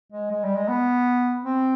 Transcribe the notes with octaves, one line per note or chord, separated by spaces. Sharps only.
G#3
G#3
G3
G#3
B3
C4